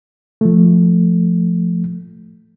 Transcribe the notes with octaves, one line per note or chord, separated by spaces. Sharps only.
F3 A3